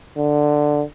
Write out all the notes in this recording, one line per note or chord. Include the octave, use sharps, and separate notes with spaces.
D3